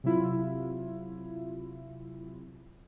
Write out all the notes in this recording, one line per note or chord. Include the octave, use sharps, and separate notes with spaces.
C3 F#3 E4 F4